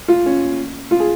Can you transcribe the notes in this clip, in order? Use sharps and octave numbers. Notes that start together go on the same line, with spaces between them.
F4
C#4
F4
G#4